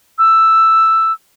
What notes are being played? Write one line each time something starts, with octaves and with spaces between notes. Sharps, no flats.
E6